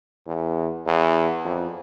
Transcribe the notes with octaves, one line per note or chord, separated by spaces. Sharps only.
E2
E2
F2